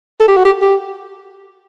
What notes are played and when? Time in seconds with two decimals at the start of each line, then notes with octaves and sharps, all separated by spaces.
0.20 A4
0.28 G4
0.37 F#4
0.45 G4
0.62 G4